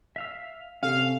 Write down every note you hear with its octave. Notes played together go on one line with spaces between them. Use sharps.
E5 F5 E6
C3 C#4 A4 F5